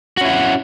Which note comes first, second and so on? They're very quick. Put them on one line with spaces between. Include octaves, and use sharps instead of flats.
F#4 C#4 E4 F#5